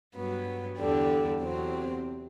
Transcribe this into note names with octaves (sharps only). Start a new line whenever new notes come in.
G2 F#3 B3
E2 D3 G3 D4
E2 C3 F#3 C4